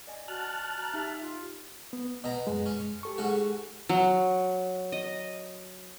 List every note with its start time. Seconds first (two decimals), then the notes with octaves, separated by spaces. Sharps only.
0.07 D5 D#5 G#5
0.28 F#4 A5 F6 F#6
0.81 A#5
0.94 D#4 G4 E5
1.22 F4
1.93 B3
2.24 B2 D#5 A#5
2.47 F#2 G#3
2.66 C#4
3.03 G4 A4 C#6
3.18 G#2 C#4 F#4
3.89 F#3
4.92 D#5